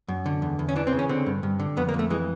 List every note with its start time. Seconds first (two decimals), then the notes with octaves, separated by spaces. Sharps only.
0.08 F#2
0.26 D3
0.42 E2
0.59 E2
0.69 C#4
0.76 E3 D4
0.87 C4
0.93 C#3
0.99 C#4
1.09 D3 C4
1.26 G2
1.43 G2
1.60 D3
1.77 F2 B3
1.89 A#3
1.94 F2
1.99 A3
2.10 E3 G#3